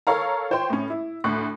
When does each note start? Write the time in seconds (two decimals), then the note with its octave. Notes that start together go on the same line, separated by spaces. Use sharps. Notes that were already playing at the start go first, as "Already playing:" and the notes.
0.07 A4 A#4 C#5 F5 A#5
0.51 F4 C5 C#5 G5 C6
0.70 A2 C#4
0.90 E4
1.24 D2 A2 C#6 F#6